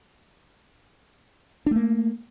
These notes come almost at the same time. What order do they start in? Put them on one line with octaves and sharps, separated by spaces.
D4 A3 A#3